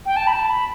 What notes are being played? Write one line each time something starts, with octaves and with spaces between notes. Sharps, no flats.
G5
A5
B5
A5
B5